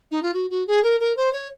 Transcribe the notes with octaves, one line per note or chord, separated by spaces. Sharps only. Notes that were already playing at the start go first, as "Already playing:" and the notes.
D#4
F4
F#4
F#4
G#4
A#4
A#4
C5
C#5